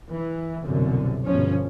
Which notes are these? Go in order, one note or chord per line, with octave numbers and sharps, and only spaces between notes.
E3
C2 F#2 B2 D3
G1 B2 F3 C#4